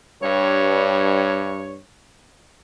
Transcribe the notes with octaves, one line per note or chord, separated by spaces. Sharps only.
G2 C#5